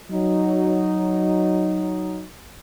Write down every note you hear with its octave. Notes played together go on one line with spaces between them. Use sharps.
F#3 D#4